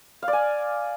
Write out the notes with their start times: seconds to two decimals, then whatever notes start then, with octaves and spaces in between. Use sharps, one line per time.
0.22 F5
0.28 D5
0.33 G#5